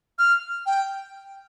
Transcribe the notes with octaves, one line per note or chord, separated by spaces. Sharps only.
F6
G5